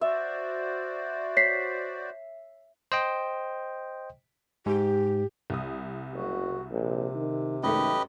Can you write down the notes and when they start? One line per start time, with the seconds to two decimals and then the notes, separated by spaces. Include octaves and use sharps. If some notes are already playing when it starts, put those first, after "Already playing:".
0.01 F#4 C5 D5 E5
1.37 C#5 B6 C7
2.92 C5 D#5 G5
4.66 G#2 G4
5.50 C2 D#6
6.13 F#1 F#4
6.71 A#1 C3
7.14 D#3
7.63 F#2 D#3 G#3 A3 G4 B4 D#5